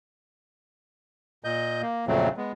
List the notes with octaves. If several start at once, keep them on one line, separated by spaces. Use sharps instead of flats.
A#2 D#5 G6
A#3
F2 A#2 C#3 F#3 A3 C4
G#3 B3